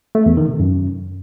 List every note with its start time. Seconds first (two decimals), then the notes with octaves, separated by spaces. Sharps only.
0.15 A3
0.26 E2
0.37 D#3
0.48 C3
0.59 F#2